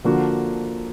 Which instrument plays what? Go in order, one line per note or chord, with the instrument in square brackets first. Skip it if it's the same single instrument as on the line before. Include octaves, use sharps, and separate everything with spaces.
[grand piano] D3 F3 A#3 D4 F#4